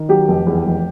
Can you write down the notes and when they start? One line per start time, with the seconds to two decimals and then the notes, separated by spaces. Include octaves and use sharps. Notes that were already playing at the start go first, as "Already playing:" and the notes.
Already playing: D#3
0.09 F#3 G4
0.28 F1
0.47 E2
0.66 F1